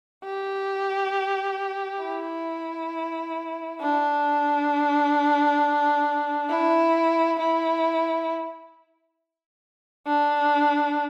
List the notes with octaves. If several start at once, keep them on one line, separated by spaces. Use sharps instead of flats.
G4
E4
D4
E4
E4
D4